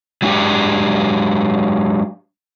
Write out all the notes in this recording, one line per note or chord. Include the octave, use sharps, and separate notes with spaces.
F#3 G#3 D4 G4 G5